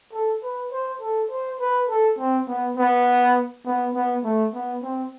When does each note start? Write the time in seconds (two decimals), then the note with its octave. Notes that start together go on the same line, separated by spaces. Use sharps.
0.13 A4
0.43 B4
0.72 C5
1.01 A4
1.31 C5
1.60 B4
1.89 A4
2.18 C4
2.48 B3
2.77 B3
3.65 B3
3.94 B3
4.24 A3
4.53 B3
4.82 C4